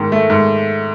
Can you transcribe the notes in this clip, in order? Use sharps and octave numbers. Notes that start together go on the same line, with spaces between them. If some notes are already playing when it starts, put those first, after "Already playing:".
Already playing: G#2 D#3
A3
G#2